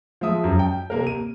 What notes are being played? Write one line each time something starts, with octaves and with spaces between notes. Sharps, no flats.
F3 G#3 E5 D#6
F#2
G5
C3 A#3 A#4
D#7